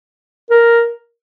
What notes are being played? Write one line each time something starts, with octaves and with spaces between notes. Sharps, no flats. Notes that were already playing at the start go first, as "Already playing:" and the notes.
A#4